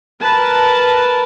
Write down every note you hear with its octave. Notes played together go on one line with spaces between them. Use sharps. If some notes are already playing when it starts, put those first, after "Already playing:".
A#4 B4 A5